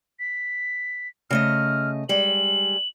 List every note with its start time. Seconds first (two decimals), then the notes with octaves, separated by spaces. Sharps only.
0.20 B6
1.31 C#3 A3 D#5 F6
2.09 G3 G#3 F#7